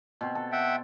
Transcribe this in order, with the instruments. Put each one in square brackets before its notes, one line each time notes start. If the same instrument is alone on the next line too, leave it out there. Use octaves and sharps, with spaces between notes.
[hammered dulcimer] B2 C4
A4
[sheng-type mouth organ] E5 F#5 G5